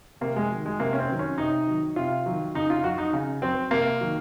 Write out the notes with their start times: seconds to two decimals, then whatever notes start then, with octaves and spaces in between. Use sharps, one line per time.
0.21 C3 A#3
0.36 G#3
0.51 D#3 F#3
0.66 G#3
0.80 C3 A#3
0.93 C#4
0.99 C4
1.08 D#3 F#3
1.19 C#4
1.38 C3 D#4
1.67 D#3 F#3
1.96 C3 F4
2.26 D#3 F#3
2.54 C#3 D#4
2.70 F4
2.84 F#3 F#4
2.98 D#4
3.13 C#3
3.42 F#3 C4
3.71 C3 A#3
4.00 D#3 F#3